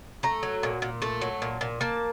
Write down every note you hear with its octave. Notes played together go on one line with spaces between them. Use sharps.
A3 A#5
F#3
A#2
A#2
A3 A5
F#3
A#2
A#2
A#3 A5